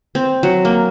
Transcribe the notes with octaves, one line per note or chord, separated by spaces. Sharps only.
C4
F#3
A#3